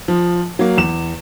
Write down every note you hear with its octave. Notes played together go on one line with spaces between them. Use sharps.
F3
F#3 A#3
E2 E7